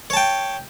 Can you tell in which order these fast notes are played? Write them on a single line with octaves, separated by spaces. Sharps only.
C#5 A5 G5